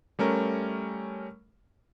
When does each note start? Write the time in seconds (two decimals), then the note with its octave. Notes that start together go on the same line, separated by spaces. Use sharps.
0.19 G3 A3 C#4 A#4